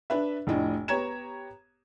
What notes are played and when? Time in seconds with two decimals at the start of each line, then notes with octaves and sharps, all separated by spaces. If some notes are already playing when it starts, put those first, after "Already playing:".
0.10 D4 B4 E5
0.47 F1 A2 D4 D#5
0.88 B3 G4 C#5 A#5 G#6 E7